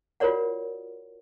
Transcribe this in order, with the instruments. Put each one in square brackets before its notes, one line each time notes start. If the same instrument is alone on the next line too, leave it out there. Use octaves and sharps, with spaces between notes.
[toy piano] F4 F#4 A#4 C#5 D5 F#5